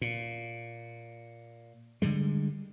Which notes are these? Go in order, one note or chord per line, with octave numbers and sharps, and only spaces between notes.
A#2
D3 E3 G3 G#3